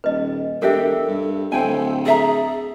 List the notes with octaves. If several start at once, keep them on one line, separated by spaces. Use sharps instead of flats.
D#1 B4 D#5
E1 D4 G4 A4 A#4 E5
G2
D1 A4 C5 G5 G#5
G#4 A4 E5 A#5